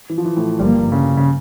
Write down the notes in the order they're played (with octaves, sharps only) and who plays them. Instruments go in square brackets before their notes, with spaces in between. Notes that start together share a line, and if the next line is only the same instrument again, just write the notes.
[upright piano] E3
F3
E3
A2
[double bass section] G1 G2 F3 A#3 [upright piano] G3
[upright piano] C#3
C#3